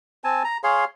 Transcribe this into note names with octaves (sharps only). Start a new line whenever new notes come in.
C4 G#5 A5
A#5
G#4 C#5 F5 C6